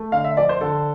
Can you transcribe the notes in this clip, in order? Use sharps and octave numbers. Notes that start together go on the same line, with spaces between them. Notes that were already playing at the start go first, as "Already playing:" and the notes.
Already playing: A3
D3 F5
E5
F3 D5
C5
D3 A4